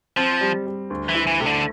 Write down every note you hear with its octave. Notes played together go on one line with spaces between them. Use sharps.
F3 C4
G3
G3
D2
E3
E4
E3
C3 A3
D3